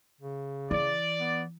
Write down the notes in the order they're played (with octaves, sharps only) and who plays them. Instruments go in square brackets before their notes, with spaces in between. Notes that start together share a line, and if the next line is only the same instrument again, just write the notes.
[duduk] C#3
[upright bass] E3 [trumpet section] D5
[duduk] B3